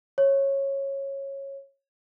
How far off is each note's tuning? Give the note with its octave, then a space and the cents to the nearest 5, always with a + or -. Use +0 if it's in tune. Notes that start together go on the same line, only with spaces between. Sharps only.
C#5 -15